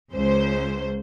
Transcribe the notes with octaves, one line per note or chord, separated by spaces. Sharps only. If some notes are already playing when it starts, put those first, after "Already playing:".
C#2 C5